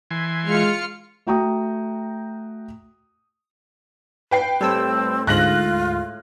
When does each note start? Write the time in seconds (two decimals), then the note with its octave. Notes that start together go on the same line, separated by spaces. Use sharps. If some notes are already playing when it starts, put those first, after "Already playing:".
0.11 E3 G#5 C6
0.47 G#3 F4 F6 C#7
1.27 A3 F#4 G5 A#5 C#6 D#6
4.31 B4 G5 C7
4.61 A2 G3 C4 A4 E6
5.27 D2 G#2 F4 F5 F#6 A#6 F#7